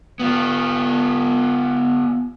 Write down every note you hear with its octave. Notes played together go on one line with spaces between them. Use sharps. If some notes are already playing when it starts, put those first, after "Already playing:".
B3 F4